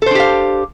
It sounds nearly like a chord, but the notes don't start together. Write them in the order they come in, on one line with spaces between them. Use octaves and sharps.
A4 C5 D4 G4 F5